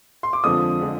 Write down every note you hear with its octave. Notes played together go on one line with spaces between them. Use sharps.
C6
D6
F2 D3 F3 G#3 D#6
D3 F3 G#3